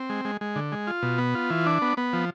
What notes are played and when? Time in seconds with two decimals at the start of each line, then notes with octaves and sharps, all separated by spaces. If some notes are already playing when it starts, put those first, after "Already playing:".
Already playing: C4
0.10 G#3
0.25 G#3
0.41 G#3
0.56 D3
0.72 G#3
0.87 F4
1.02 B2
1.18 B3
1.35 F4
1.50 E3
1.66 D4
1.82 B3
1.97 B3
2.13 F3